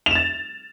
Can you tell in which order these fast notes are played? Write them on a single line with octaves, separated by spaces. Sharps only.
F7 E7 A6